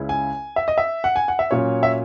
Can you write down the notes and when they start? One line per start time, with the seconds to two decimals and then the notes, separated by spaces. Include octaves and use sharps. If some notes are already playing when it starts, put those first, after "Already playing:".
Already playing: C#2 C#3 G#3 C#4 E4
0.09 G#5
0.56 E5
0.68 D#5
0.78 E5
1.04 F#5
1.16 G#5
1.28 F#5
1.39 E5
1.51 A#2 F#3 C#4 C#5
1.83 E5